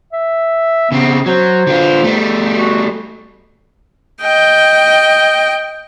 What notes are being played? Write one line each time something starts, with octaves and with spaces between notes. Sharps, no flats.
E5
C#3 B3 C4
F#3 C5
D3 F4
G3 A3
F#4
D#5 G5